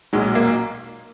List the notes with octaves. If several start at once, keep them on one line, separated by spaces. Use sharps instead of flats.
B1 A#2 F#3 G#3
A#3